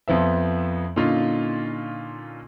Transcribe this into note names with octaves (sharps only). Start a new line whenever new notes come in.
F2 F3 B3 E5
A#2 D3 C#4 D#4 F4